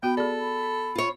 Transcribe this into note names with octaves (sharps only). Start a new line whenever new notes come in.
B3 F#4 G5 B5
G#4 A4 D5
B5
F4 C#5